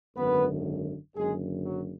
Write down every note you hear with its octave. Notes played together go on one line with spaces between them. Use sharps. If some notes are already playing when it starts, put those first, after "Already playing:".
G#1 F#2 D3 B3 B4
F#1 F#2 D3 G#3 G#4
F#3 F#4